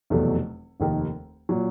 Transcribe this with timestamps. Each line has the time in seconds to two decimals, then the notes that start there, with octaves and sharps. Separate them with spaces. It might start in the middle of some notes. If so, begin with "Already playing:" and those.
0.10 F1 E2 B2 F#3 A3
0.80 F1 D#2 D#3
1.49 A#2 F#3